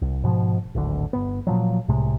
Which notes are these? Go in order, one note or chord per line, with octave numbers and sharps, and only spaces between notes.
C2
G#2 B2 F3
D1 G#1 D2 D3
G1 B3
A#2 F3 F#3
C2 A2 C3 G#3